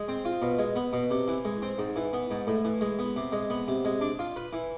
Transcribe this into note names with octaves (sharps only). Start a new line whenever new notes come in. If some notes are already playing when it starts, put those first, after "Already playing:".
Already playing: G#3
C4
F4
B2
G#3
B3
B2
C3
E3
G#3
C4
G#2
E3
B3
G#2
A2
E3
G#3
B3
C3
G#3
B3
C3
G#3
D4
F4
B4
E3